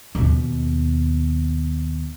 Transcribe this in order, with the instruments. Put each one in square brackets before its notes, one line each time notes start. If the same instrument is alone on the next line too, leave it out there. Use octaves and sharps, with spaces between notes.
[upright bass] D#2 B2